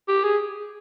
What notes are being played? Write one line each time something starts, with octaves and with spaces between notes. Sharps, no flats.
G4
G#4